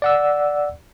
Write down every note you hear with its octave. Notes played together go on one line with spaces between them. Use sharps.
D5 F#5 E6